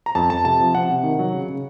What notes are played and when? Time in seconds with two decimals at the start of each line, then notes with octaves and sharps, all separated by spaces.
0.06 A#5
0.15 F2 A5
0.30 F2 A5
0.45 C3 A5
0.60 F3
0.75 C3 F#5
0.90 C3
1.03 D#3
1.19 F#3
1.33 C#3
1.49 C#3